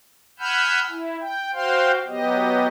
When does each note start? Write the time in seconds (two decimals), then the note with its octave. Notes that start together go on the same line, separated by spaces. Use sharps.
0.39 F#5 G#5 B5 E6 F6 G6
0.89 E4
1.20 G5
1.53 F#4 C5 F5 G5 C6
2.07 F#3 B3 G4 D#5